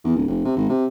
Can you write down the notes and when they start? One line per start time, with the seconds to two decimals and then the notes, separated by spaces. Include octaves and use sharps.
0.04 E2
0.16 D1
0.27 F1
0.44 C3
0.56 G#1
0.69 C3